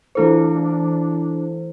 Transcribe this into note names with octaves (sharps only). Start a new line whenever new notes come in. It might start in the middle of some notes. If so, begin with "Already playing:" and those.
E3 A3 D4 E4 A4 C5